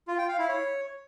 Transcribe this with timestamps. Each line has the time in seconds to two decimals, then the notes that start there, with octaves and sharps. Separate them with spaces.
0.08 F4
0.18 G5
0.28 F5
0.38 E4
0.49 C#5